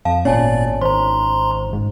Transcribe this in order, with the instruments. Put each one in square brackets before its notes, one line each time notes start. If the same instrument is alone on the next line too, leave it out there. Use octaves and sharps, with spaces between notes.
[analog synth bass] F2 [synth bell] F5 A5
[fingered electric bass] G#1 B3 C#4 [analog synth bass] A#2 [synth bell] C#5 G#5 A5 [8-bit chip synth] D5
[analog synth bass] D#3 [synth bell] C5 [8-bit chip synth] A#5 C6
[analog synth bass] G#2